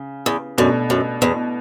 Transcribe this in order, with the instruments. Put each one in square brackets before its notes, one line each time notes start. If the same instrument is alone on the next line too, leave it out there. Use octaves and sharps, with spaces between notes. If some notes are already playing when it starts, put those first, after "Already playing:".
Already playing: [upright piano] C#3
[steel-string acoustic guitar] E2
[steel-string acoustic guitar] F#2 [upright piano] B2 A3 D4
[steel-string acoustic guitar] F#2
E2